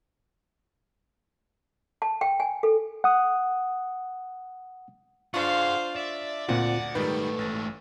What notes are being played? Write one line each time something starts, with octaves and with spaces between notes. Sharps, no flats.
A5
G5
G#5
A4
F#5 D#6
D4 F4 G#4 C5 F5 F#5 C#6
D5 E5
D2 A#2 C4 F4 F#5
G#2 D#3 G3 A3 B4
A1 A6